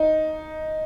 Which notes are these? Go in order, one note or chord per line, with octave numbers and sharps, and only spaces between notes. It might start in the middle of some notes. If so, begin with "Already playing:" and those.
Already playing: D#4